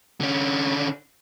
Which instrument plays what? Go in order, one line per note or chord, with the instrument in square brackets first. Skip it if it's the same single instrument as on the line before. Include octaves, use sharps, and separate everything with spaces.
[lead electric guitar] D3 C#4